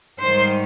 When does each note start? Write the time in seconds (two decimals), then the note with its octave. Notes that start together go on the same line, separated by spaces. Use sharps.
0.19 G#2 D#3 G3 C5